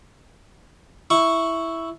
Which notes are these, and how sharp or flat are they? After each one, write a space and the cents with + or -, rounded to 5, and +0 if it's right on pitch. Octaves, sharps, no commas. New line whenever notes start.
E4 +0 C#6 +0